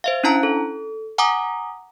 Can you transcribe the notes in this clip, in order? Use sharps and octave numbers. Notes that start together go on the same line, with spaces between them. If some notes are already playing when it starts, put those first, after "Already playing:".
C5 E5 F5
C#4 D4 E4 A5 A#5 F#6
A4
F#5 G#5 A#5 D6 D#6